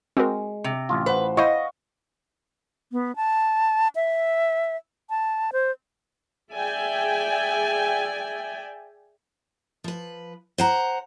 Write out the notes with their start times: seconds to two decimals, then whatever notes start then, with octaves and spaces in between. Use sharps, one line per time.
0.17 G#3 C4 F#4 A#4
0.64 C3
0.89 A1 F4
1.06 B4 C5 F#5
1.37 E4 C5 D#5 F5 F#5 C#6
2.92 B3
3.16 A5
3.95 E5
5.10 A5
5.53 C5
6.52 G#4 D5 E5 G5 G#5
9.84 F3 B4
10.58 C5 F#5 A#5